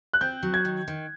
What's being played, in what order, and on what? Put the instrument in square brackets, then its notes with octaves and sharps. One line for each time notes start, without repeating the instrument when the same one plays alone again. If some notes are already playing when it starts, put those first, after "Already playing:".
[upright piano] F#6
[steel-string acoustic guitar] C4 [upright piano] G6
[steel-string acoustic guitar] F#3
[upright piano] G#6
[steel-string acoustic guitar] D#3
D#3